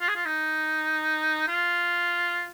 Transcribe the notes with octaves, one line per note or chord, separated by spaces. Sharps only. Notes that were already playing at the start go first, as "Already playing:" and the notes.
F4
G#4
F4
D#4
F4